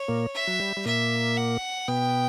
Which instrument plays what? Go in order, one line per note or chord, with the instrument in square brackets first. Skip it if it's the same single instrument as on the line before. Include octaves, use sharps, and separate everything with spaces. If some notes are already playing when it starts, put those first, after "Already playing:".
Already playing: [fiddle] C#5
[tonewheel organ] A#2 A#3
[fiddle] E5
[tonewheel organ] F#3
G3
G3
[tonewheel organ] A#2 A#3 [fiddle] E5
[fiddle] F#5
[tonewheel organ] B2 B3 [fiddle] G5